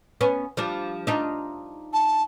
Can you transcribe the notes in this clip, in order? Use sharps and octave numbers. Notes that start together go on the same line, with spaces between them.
B3 C#4
F3 G3 D4
D4 D#4 F4
A5